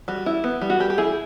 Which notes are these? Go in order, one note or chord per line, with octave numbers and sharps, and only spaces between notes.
G3 F#4
E4
B3
G3
F#4
G3 G4
G4
E4 G#4